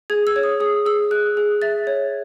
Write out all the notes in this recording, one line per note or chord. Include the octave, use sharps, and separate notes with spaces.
G#4 G#6
E6
C#5
D#6
G#4 D#6
G#4 E6
G#4 F#6
G#4
E5 A6
C#5